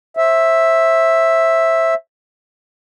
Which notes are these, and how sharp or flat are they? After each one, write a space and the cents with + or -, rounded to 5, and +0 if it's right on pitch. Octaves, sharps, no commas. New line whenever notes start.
C5 +35 E5 +0